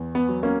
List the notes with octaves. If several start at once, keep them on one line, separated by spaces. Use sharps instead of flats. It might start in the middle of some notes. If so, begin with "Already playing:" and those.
Already playing: E2
B3
F#3
A#3 C#4